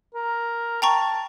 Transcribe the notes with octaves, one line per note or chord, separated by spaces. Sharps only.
A#4
G5 A5 A#5 C#6